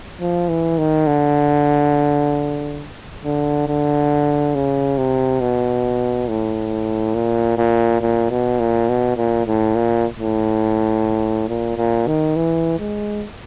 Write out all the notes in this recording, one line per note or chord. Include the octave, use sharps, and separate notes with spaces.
F3
E3
D#3
D3
D3
D3
C#3
C3
B2
A2
A#2
A#2
A#2
B2
A#2
B2
A#2
A2
A#2
A2
A#2
A#2
D#3
E3
G#3